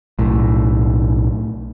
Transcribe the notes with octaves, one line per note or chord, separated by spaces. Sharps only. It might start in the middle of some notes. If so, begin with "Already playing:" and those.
B1 A2